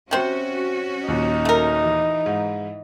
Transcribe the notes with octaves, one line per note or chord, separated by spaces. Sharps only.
C3 C4 C#4 F#4 C5
D#2 A#2 D#4
A3 A#4
E3
G#2